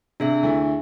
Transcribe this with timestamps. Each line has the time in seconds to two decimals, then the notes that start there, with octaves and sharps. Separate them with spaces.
0.20 C3 D4 G#4 E5
0.43 D2 A3 E4